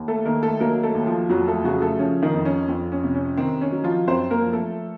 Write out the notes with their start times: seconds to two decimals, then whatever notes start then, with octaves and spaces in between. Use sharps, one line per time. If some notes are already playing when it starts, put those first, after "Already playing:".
Already playing: D#2
0.08 A3 A4
0.25 D#3 A#3 A#4
0.43 A3 A4
0.60 F#3 A#3 A#4
0.83 A3 A4
0.95 D#2
1.06 F3 F4
1.29 F2 F#3 F#4
1.48 A3 A4
1.64 C#3 F#3 F#4
1.81 A3 A4
1.99 F3 C#4
2.22 D#3 D#4
2.34 F2
2.45 C#4
2.68 F2 C4
2.92 C#4
3.04 C3
3.15 C#4
3.37 D#3 C4
3.61 C#4
3.72 F#3
3.84 F3 F4
4.07 F#2 C4 C5
4.31 A#3 A#4
4.42 F3
4.53 A3 A4